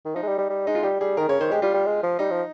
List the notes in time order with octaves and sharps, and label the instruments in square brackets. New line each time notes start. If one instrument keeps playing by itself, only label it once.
[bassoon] D#3
[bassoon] F3 [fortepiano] D#4
[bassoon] G#3
G3
G3
G3
[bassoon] G#3 [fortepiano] D#4
[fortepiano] F4
[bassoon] G3 [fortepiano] G4
[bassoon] G3 [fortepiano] G#4
[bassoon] D#3 [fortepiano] A#4
[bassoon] C#3 [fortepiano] C#5
[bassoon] D#3 [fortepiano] C5
[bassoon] G#3 [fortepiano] G4
[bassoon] G3 [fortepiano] F4
[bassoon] G3
G#3
F3
[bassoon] G3 [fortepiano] D#4
[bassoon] F3